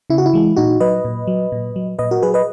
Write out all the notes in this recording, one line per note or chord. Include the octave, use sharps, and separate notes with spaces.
C#3 E4
F#4
E4
E3 G#3
A#2 D#4 F#4
F#3 B4 D#5
A#2
F#3
A#2
F#3
A#2 B4 D#5
F#4 A#4
F#3 G#4 B4
B4 D#5